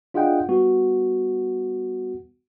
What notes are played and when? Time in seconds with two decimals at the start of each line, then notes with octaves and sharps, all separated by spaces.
0.14 D4 F4 G#4 D#5 F#5 G5
0.49 G3 B3 F#4